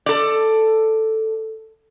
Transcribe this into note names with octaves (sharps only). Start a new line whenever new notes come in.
A4 D5